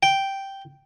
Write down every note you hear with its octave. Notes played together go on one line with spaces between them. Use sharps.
G5